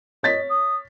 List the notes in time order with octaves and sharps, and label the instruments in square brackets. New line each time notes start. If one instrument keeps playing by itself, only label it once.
[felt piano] C#5 A6 B6 [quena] D#5
[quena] D#6